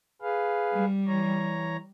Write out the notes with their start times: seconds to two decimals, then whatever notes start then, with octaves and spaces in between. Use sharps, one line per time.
0.22 G#4 B4 F5
0.73 G3
1.08 E3 C#5 A#5